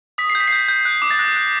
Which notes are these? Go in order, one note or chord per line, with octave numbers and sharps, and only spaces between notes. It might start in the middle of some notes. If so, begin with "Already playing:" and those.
D#6 B6
C7
G6
B6
C7
G6 B6
G6
F#6
D6
A6
F#6 A#6
F#6